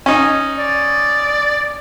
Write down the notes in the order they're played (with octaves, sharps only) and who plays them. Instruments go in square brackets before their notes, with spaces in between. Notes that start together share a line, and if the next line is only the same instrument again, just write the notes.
[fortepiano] C#4 D#4
[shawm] D5